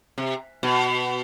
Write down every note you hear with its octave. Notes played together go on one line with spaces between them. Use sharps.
C3
B2